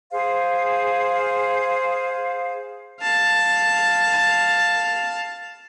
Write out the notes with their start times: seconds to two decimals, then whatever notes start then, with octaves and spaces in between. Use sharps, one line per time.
0.11 G#4 C5 F5
3.01 F5 A5